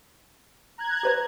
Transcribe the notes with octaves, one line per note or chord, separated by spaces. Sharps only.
A#5 F#6 G#6
G4 B4 C5